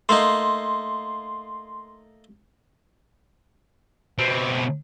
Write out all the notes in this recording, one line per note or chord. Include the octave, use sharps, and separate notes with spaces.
A3 A#3 D#4 C6
B2 C4